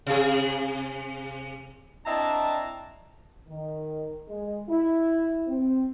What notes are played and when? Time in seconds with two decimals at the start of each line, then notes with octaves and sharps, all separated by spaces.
0.07 C3 G#4
2.06 C4 D4 E4 D#5 A5 A#5
3.49 D#3
4.28 G#3
4.69 E4
5.48 C4